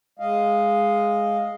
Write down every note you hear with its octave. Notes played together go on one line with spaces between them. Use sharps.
G#3 D#5 F5